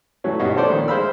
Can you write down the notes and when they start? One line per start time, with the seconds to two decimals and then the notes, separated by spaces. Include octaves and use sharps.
0.24 E3 F#3 A3 C#4
0.39 G2 B2 B3 D#4
0.56 C#4 D4 A4 C5 D5
0.70 A#1 D#3
0.88 G#3 C5 F5 B5 E6